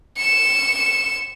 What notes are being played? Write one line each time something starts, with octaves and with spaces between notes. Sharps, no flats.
C#7 E7